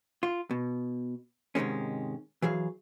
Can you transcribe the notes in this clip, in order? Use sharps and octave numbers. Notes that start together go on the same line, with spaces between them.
F4
B2
G#2 C3 D#3 G#3 C#4
E3 F#3 G#4 F5